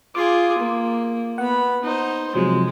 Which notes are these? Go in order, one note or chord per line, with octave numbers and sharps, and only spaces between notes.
F4 G#4 C6 D6
A#3
B3 F#5 B5
D#4 C5
C3 F3 F#3 G#3